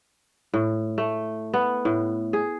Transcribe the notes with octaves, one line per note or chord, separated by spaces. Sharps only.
A2
A3
B3
A2
G#4